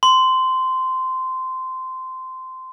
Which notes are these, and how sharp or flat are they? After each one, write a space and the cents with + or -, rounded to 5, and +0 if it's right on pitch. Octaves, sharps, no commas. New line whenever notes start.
C6 -15